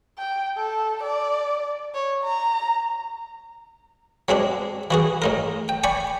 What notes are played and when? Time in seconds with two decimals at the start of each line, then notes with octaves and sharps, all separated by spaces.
0.18 G5
0.57 A4
1.03 D5
1.95 C#5
2.24 A#5
4.28 F#3 G#3 C4 D4
4.91 E3 F#4 G#4
5.22 A2 D#4 A#4
5.69 G5
5.84 D5 G5 G#5 B5 C#6